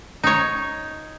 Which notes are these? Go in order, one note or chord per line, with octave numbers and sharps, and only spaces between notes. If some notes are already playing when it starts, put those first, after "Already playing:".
D#4 C#5